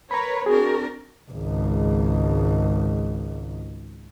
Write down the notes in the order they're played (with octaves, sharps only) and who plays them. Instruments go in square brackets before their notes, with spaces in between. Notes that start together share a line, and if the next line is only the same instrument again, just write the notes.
[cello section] A#4 B4 C#5 [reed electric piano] A#5 B5
[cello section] C4 D4 A#4 [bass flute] F#4 [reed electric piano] G#4
[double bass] G#1 C#2